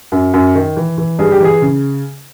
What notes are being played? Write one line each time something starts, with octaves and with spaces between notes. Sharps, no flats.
F#2
F#2
D#3
E3
E3
G2 G#4
G4
E3 G#4
C#3